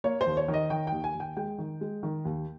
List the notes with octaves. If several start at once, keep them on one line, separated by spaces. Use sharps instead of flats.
A#3 C#5
C5
D#2
C#5
D#3
D#5
D#3 G5
D#2 G5
G#5
D#2
G5
G#3 G5
D#3
G#3
D#3
D#2